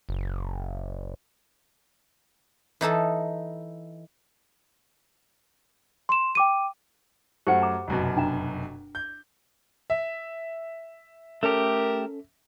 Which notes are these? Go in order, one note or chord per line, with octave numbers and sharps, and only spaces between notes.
F#1
E3 D#4 A4 A5
C6 E7
G5 D6 D#7
F#2 A3 G4 C5 F#5 C#7
G#5 A#5 D6
F1 F#2 B2
D4 G5 A#5
G6
E5
A3 C#4 G4 A4 A#4